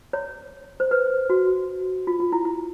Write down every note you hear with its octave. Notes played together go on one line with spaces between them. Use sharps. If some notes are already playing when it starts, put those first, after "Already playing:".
C#5
C5
B4
F#4
F4
F4
E4
E4